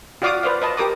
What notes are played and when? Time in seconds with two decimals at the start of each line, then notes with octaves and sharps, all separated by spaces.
0.22 F4 F#4 D5 F5 D6 D#6
0.43 B4 C5 D5 F5
0.62 B4 D#5 A5
0.77 G4 A#4 D6 D#6